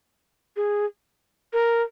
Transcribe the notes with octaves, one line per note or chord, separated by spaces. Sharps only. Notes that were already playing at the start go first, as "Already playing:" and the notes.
G#4
A#4